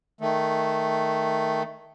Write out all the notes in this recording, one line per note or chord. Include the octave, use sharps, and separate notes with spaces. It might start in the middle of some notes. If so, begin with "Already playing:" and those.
D#3 A3